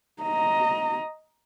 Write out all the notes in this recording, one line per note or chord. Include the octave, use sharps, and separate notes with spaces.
D#5 A#5